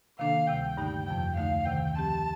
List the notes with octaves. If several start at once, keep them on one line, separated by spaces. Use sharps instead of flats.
C3 D#3 A#3 D4 A4 F5
D2 C3 G3 G5
G2 D3 A3 D#4
F2 C3 F3 G5
D2 D3 A3 D#4 F5
D2 C3 D#3 G5
F3 C4 G4 A5